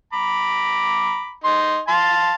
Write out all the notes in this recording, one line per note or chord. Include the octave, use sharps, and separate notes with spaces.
A#5 B5 D6
D#4 C6
F5 A5 C6